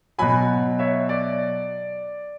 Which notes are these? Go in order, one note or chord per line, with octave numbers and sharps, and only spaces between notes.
B2 F#3 G#5 B5
C#5 E5
D5